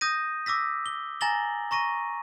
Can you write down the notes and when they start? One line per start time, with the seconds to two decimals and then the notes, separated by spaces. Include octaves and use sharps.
0.01 D#6 G6 A#6 D#7
0.46 D6 E6 A#6 B6
0.86 G7
1.21 G#5 A#5 A6 A#6 F#7 G7
1.71 A#5 C#6 A#6 D#7